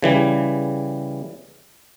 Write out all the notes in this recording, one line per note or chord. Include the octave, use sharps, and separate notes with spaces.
C#3 E3 G3